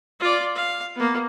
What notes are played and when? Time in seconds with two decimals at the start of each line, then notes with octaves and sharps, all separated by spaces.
0.20 F4 D5
0.55 F5
0.96 A#3 B3